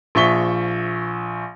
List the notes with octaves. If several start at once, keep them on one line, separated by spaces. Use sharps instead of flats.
A#1 F3 E5 C#6 B6 G7